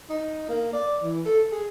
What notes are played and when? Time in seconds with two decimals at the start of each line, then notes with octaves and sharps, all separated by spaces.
0.09 D#4
0.49 A#3
0.73 D5
1.02 E3
1.26 A4
1.52 G#4